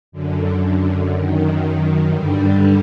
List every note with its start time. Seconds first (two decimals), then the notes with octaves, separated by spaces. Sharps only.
0.12 F#2 D3
1.10 F#2 D#3
2.08 G2 D3 G3